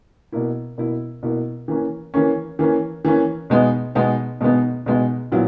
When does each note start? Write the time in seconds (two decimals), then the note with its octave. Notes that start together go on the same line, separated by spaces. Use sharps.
0.32 B2 A#3 E4
0.78 B2 A#3 E4
1.23 B2 A#3 E4
1.68 E3 A#3 C#4
2.14 E3 A#3 C#4
2.59 E3 A#3 C#4
3.05 E3 A#3 C#4
3.50 B2 G#3 B3 D#4
3.95 B2 G#3 B3 D#4
4.41 B2 G#3 B3 D#4
4.86 B2 G#3 B3 D#4
5.32 A#2 F#3 B3 E4